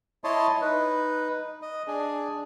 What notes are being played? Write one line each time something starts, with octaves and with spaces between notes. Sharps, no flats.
E4 C#5 D#5 A5 C6
D#4 B4
D#5
D4 G#4